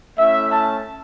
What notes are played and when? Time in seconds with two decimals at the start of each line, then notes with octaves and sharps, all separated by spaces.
0.17 A3 C#4 E4 E5
0.49 A5